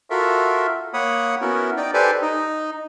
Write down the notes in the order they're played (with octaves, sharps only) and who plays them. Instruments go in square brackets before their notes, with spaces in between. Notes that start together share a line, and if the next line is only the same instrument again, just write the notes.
[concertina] F4 F#4 A4 A#4 E5
A#3 C#5 F#5 B5 D#6
B3 C#4 E4 F#4 A#4
D#4 D5 G5
G4 A4 B4 C5 D5 G#5
D#4